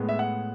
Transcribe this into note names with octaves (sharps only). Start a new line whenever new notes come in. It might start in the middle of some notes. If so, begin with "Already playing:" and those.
Already playing: A2 G#3 B3
E5
F#5